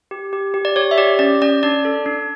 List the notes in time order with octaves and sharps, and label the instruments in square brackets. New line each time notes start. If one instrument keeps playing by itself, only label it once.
[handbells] G4
G4
G4
D5
G4 C#5
E5
G4 D5
C#4 D5
C#4 D5
D4 D5
A4
D4